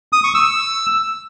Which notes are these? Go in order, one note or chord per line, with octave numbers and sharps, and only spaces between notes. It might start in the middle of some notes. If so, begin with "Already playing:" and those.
D#6
C#6
E6